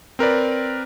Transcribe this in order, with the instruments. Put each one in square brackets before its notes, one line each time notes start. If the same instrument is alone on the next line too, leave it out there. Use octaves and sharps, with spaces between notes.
[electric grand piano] C4 A#4 B4 D5